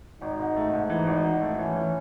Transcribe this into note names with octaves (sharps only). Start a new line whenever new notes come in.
G#1 D#4
G#2
A3
G#2
E3 D#4
G#1
G#1
A3
E3 C#4
E3